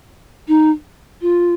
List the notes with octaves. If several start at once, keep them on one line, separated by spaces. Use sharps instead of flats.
D#4
F4